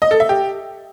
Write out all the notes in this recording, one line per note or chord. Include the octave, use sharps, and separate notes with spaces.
D#5
A4
E5
G4